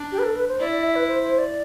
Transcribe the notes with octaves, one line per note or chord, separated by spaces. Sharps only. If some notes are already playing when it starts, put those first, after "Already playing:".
Already playing: D4
G4
B4
A4
B4
C5
E4 D5
D5
E5
B4
C5
C5
D5